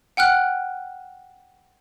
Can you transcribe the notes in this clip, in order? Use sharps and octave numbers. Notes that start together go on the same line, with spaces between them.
F#5 G5 F6 F#6